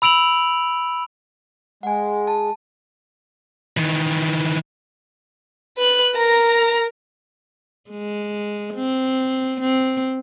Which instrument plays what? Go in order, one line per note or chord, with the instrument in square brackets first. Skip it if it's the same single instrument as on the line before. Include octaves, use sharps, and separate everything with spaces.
[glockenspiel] B5 E6 D7 F7 F#7
[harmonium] G#3 [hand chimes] F#5 G#5
[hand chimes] A5
[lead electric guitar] D#3 E3
[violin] B4 F#6
A#4 A#5
[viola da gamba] G#3
C4
C4